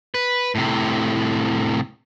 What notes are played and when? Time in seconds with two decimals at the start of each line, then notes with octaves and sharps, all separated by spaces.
0.14 B4
0.55 A2 C3